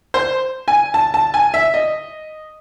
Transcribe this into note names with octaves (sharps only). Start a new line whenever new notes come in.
C5
G#5
A5
A5
G#5
E5
D#5